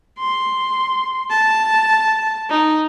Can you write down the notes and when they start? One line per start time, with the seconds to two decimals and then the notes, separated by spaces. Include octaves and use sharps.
0.20 C6
1.31 A5
2.50 D#4